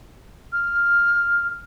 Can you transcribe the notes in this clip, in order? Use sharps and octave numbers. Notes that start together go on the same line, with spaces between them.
F6